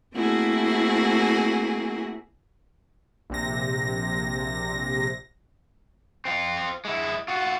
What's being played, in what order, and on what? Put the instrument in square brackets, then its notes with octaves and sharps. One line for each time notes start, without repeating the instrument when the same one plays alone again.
[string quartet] A3 A#3 C4 E4 F#4 G#4
[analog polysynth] A#1 C3 A#6
[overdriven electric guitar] C4 F4
G#3 E4
F4 F#4